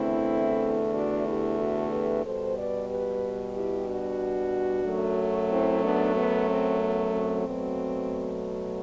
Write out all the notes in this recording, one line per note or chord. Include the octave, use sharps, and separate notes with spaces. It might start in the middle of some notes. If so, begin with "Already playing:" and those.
Already playing: E2 D3 A3 C4 E4
D4 F#4
E4 G4
F#4 A4
G4 B4
B2 G3 A4 C5
B4 D5
G4 B4
E4 G4
D4 F#4
F#2 F#3 A3
C4 E4
B3 D4
B3
C4
B3
C4
B2 F#3 A3